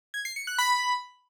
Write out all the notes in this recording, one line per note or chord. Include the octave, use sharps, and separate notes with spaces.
G#6
C7
C#7
F#6
B5